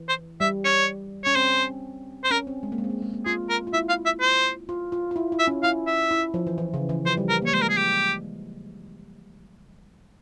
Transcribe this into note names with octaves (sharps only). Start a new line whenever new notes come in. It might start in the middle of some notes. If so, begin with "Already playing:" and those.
Already playing: E3
C5
G3 E5
C#5
C#4 C#5
C4 C5
C5
C#4 A#4
C4
G#3
A#3
G#3
C4
A#3
G#3
A#3
F4 G#4
A#4
F4
E4 E5
F5
E5
C5
F4
F4
F4
E4
E4
E5
C#4
E4 F5
E5
E4
F3
E3
E3
C#3
E3
F3 C5
G3
A#4
A#3 C#5
G#3 C5
A#4
G#4
G4